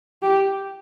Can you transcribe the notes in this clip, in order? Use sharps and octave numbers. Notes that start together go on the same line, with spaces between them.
G4